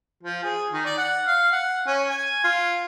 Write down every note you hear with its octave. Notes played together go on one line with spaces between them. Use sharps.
F3
G#4
D#3
D5
F#5
F5
F#5
C#4
G#5
F4